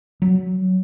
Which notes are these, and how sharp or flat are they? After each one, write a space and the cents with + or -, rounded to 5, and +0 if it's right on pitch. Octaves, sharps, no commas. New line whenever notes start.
F#3 +10